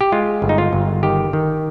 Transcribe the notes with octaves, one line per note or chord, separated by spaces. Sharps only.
G4
G#3 F4
G1
D#4
F4
G1
D#3 G4
D#3